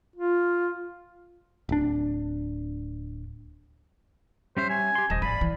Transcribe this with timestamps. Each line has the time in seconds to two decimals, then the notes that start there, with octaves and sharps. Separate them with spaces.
0.16 F4
1.69 D1 D4
4.57 G3 C#4 C5 E5
4.70 G#5
4.95 G4 C6
5.10 D#1 C5 D#5 A5
5.22 G#1 D5 F5 G#5 B5
5.41 E3